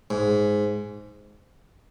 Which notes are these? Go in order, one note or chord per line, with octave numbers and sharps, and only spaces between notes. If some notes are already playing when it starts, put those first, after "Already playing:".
G#2